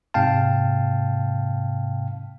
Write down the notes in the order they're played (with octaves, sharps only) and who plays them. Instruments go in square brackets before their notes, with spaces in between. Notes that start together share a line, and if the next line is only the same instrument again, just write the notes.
[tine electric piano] G#2 C3 F5 G5 A5